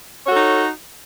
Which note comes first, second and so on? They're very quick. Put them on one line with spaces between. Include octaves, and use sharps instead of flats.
C#5 F#4 A4 D#4